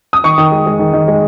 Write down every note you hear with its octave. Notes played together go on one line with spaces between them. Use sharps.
D#6
D#3 C#6
D#3
G#3
G#3
D#3
D#3
G#3